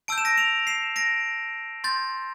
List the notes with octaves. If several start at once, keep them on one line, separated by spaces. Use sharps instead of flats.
A5 E6 G6 D7
E7
A#6 D7
D7 F7
C7 E7
A#6 D7
C6 G6 A6